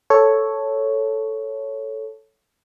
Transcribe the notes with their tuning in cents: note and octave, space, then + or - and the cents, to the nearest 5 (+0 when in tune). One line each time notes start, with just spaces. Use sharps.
A4 +0 C#5 +0